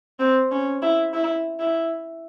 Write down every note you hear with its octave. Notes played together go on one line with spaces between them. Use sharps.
C4
C#4
E4
E4
E4